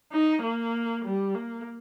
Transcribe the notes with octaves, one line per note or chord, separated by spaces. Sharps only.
D#4
A#3
G3
A#3